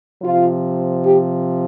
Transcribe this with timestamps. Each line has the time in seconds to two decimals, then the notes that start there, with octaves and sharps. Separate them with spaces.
0.23 C3 F3 F4
1.04 G4